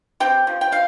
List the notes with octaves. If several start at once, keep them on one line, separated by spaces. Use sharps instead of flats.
C4 G4 G5
F3
G5
F3 F5